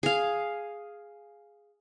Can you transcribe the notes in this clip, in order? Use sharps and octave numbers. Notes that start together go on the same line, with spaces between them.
G#4 F5